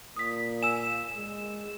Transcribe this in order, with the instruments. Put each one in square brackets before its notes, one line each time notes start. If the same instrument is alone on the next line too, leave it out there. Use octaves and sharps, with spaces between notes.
[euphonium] A#2 [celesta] D#6 B6
[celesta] G#5 E6 [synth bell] E7
[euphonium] G#3